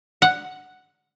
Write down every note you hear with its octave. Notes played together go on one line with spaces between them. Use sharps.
F#5